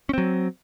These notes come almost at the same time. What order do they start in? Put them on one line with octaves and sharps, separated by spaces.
C#4 C4 F#3